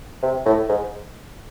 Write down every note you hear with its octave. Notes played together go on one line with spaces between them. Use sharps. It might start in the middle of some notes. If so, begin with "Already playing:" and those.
C3
A2
G#2